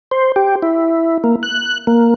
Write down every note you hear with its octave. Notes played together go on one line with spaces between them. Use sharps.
C5
G4
E4
A#3
F#6
A#3